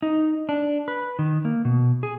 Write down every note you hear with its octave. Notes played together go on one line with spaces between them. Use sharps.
D#4
D4
B4
D#3
A#3
B2
G#4